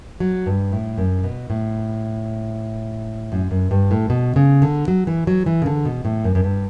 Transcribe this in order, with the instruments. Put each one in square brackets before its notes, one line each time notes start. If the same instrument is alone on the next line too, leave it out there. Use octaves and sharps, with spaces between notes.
[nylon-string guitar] F#3
G2
A2
F#2
B2
A2
F#2
F#2
G2
A2
B2
C#3
D3
F#3
E3
F#3
E3
C#3
D3
B2
A2
F#2
F#2
G2